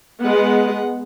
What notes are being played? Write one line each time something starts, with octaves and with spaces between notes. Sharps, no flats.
G#3 B3 F#5